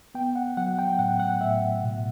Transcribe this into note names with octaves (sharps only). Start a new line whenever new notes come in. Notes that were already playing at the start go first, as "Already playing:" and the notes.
B3 G5
F#5
F#3 F#5
G5
A2 F#5
F#5
A2 E5
B2